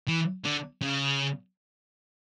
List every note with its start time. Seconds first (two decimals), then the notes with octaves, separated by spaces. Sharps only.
0.08 E3
0.45 D3
0.82 C#3